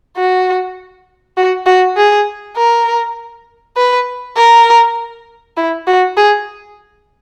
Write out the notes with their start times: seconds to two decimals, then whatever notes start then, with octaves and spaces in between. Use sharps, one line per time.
0.17 F#4
1.37 F#4
1.66 F#4
1.97 G#4
2.57 A#4
3.77 B4
4.37 A#4
5.57 E4
5.87 F#4
6.17 G#4